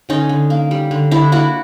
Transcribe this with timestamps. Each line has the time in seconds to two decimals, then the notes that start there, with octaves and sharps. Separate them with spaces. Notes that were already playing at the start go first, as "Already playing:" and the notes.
0.09 D3 C#4 D#4
0.29 D3
0.50 A#3
0.71 G3
0.91 D3
1.11 D3 D4 E4
1.32 A#3 E4 F#4